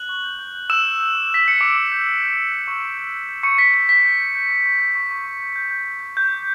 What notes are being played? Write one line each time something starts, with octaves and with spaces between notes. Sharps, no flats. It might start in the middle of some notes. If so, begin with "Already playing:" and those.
Already playing: F#6 F#7
C#6
G6
G6
G6
E6 G6 E7
G6
G6
D6
G6 B6
G6 C#7
D6 D7
D6
G6
D6
G6
D6
G6
C#6
C#6
G6
G6
G6
C#6 G6 C#7
C#6 B6
C#6 B6
G6 B6
G6
G6
G6
C#6
C#6
G6
C#6
C#6
C#6
G6
G6
G6
G6
G6
G6
D6